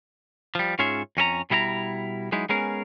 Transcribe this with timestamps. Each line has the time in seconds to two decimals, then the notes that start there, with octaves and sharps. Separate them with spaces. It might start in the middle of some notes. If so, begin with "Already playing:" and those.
0.55 F3 G3
0.79 G#2 C#4 F4 G#4 C#5 E5
1.17 F2 C#4 A4 A#5
1.50 B2 G3 E4 D#5 A#5
2.32 F#3 G#3 D#4 E4
2.49 G#3 B3 C#4 G#4 A#4